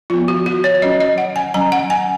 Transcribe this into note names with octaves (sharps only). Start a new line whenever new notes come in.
F3 B3 F4
F#4
F#4
C#5
F#3 C#4 D#5
D#5
F#5
G#5
F#3 C#4 A#5
F#5
G#5